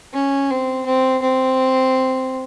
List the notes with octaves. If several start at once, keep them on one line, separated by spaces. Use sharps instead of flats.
C#4
C4
C4
C4